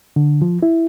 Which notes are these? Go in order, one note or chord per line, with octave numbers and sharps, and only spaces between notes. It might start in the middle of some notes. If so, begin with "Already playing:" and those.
D3
F3
E4